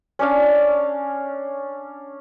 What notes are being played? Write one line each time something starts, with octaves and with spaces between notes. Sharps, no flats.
C#4 D4 F5